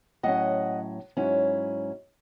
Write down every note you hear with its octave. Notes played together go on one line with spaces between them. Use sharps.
A2 F#3 C#4 D#5 F#5
G#2 F#3 C#4 E4